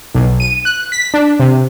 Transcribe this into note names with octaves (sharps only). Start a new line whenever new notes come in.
B1
D#7
F#6
B6
D4
C3